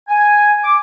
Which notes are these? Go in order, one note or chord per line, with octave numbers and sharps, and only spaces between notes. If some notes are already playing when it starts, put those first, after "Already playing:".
G#5
D6